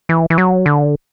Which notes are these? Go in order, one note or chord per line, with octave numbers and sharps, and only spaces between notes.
E3
E3
F#3
D3